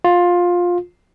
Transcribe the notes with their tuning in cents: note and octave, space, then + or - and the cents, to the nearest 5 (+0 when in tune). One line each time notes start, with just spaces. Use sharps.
F4 +15